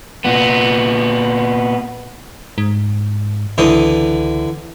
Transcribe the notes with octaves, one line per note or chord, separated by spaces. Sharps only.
A#2 B3
G#2
C#2 D3 E3 D#6